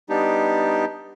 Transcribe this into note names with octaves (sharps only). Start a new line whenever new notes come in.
G3 B3 D4 D#4 G4